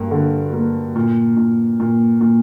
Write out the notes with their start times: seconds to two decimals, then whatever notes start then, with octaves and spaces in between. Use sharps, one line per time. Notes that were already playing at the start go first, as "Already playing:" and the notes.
Already playing: G2 A#3
0.11 D3
0.53 A#3
0.96 A#2
1.37 A#2
1.80 A#2
2.21 A#2